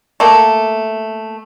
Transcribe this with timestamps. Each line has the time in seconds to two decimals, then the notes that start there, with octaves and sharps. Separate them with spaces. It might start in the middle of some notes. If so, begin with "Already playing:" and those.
0.20 A3 A#3